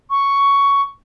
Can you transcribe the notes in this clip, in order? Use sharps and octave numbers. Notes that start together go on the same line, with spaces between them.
C#6